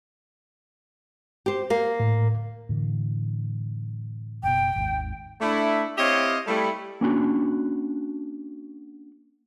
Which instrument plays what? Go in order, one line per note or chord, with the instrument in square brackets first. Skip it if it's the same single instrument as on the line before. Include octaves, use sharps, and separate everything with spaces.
[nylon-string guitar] G4 C5
A#3 A#4 F5
[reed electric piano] A2
[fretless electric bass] A2 D3 E3
[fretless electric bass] F#1 B2 [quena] G5
[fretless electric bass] G#1 D#2 G#2
[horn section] A3 D4 E4
C4 E4 G4 C#5 D#5 F5
G3 A3 E4
[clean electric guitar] A#3 C#4 D4 F#4